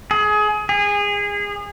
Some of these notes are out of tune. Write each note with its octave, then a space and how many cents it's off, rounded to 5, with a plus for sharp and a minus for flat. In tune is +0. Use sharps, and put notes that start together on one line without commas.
G#4 +25
G#4 -25